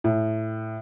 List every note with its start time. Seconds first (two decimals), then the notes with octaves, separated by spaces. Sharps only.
0.04 A2